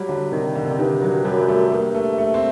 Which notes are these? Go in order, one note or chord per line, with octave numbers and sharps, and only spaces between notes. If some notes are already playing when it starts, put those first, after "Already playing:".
Already playing: F#3 G3
D3
C3 D#3
D3
C3
D3
G2 D#3
F#3
F#2 G3
A3
G2 A#3
A3
A3
C4